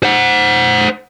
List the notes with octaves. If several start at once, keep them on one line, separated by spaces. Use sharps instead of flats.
C5 F#5